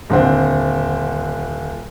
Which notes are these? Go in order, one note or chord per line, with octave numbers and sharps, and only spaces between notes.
D#1 D3 C4